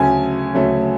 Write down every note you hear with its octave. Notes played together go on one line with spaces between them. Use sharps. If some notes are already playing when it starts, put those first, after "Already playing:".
Already playing: D2 C#3 F#3 A3 C#4 G#5
D2 C#3 F#3 A3 C#4